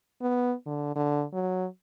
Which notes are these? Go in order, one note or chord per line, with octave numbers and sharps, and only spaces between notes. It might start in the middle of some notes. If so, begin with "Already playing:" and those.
B3
D3
D3
F#3